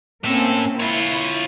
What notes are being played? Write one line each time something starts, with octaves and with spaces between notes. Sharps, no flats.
A2 A#3 C4 C#4 A4
E4 F4 C#5